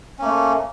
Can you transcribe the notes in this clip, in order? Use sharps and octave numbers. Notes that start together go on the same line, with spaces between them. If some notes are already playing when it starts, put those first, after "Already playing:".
A3 A#3 C#4